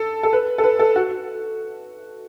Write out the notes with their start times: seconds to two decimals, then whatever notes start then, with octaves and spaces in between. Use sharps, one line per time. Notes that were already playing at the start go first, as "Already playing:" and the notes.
Already playing: A4
0.23 A4
0.33 B4
0.58 A4
0.64 B4
0.79 A4
0.96 F#4